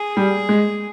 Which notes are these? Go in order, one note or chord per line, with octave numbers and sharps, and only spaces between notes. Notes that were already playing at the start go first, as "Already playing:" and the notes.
Already playing: G#4
G3
G#3